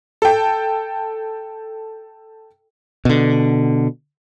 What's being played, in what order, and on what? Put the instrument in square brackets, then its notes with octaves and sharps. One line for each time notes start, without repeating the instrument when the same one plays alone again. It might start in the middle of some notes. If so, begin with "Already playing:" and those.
[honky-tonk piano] A4 G5
[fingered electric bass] B2 D3